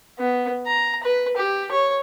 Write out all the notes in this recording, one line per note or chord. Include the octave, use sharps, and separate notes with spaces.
B3
A#5
B4
G4
C#5